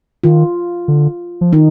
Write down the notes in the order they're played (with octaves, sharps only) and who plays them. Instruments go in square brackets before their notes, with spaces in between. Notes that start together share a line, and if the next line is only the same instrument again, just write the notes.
[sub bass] D#3 [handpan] F4
[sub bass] D3
F3
[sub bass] D#3 [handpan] D#4